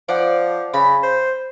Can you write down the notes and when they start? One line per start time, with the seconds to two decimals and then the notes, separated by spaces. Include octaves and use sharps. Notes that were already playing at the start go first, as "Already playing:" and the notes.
0.09 F3 D5 F#5
0.74 C#3 B5
1.03 C5